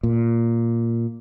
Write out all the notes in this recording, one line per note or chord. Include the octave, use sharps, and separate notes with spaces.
A#2